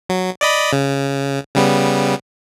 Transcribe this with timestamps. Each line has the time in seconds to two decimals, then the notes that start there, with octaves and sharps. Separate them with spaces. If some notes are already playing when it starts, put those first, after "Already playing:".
0.09 F#3
0.41 D5 D#5 B5
0.73 C#3
1.55 C#3 G3 B3